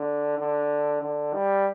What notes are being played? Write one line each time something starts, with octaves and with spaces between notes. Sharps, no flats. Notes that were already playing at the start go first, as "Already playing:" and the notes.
Already playing: D3
D3
D3
G3